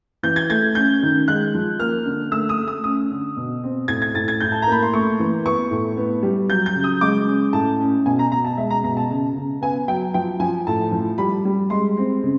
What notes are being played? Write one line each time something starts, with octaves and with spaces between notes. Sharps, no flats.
E3 G6
G#6
A3 G#6
C#4 G6
D#3
G#3 F#6
F3
A#3 F6
D3
A3 E6
D#6
A3
D#6
C#4 D#6
D3
B2
C4
A2 G#6
G#6
A2 A6
G#6
A2 G6
A5
A#5
A#3 B5
C6
A3 C#6
E3
B3 C#6
A2
B3
G3
F#3 G6
G6
C#3
D#6
G#3 D6
C#4
A2 A5
C#4
B2 G#5
A#5
B2 A#5
A5
G#3 E5
A#5
B2 A#5
A5
C#3
C#3
B3 G#5
F#3 G5
F3 G5
F3 G#5
A2 A5
F3
G3 B5
G3
G#3 C6
C4
C#3